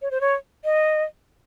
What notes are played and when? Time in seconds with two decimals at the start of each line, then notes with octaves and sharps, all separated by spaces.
0.02 C#5
0.11 C5
0.21 C#5
0.65 D#5